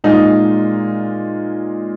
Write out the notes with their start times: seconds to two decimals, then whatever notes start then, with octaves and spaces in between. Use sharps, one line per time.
0.04 A#2 G#3 D#4 F4